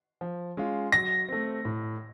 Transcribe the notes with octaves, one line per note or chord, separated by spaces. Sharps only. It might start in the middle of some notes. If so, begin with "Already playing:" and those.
F3
G#3 C#4 F4
F#3 A#6
A3 C4
A2